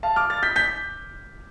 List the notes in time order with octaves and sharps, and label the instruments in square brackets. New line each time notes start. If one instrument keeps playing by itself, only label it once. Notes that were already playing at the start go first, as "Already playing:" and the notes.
[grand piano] F5 A5
D6 F6
F6 A6
G6 B6
G6 B6